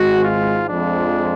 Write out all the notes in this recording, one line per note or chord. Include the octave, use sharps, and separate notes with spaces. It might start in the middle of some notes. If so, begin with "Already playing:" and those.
Already playing: G#1 G#2 G#3 F#4
F4
F2 F3 G#3 D4